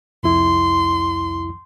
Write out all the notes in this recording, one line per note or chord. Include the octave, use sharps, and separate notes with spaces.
C2 F2 E4 C6